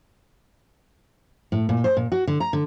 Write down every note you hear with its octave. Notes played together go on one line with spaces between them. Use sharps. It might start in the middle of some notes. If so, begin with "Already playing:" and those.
A2
A#2
C5
A#2
F#4
D3
A#5
D3